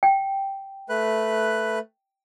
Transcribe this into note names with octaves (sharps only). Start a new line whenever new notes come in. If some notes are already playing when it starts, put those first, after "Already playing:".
G5
A3 B4 F#6